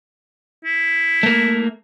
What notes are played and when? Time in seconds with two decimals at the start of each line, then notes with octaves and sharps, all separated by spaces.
0.65 E4
1.23 A3 A#3